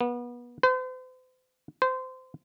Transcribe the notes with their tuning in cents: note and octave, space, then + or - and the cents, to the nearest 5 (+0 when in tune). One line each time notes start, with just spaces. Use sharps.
B3 -30
C5 -45
C5 -25